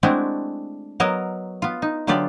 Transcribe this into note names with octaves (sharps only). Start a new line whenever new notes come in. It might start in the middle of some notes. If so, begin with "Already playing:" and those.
G#3 A3 C4 D4 E4 F#4
F#3 B3 A#4 C#5 D#5
B3 F4
D#4
D3 F#3 B3 F4 G4 D5